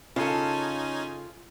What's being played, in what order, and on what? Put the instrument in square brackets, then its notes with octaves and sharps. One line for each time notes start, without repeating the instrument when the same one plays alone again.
[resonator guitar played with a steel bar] C#3 A4 [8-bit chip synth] C#4 D#4 G#5 [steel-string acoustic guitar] F4